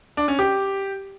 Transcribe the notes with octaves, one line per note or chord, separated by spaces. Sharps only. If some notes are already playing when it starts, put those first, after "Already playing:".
D4
C#4
G4